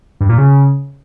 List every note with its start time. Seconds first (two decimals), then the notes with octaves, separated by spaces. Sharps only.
0.20 G2
0.29 A#2
0.38 C#3